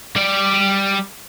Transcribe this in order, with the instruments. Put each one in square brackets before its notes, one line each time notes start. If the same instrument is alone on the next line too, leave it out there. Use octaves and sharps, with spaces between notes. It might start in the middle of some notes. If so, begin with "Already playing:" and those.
[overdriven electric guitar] G3 D5